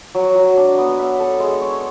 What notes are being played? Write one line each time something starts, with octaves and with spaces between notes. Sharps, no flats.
F#3
F#3
D4
B3
E5
A4
G#3
C#5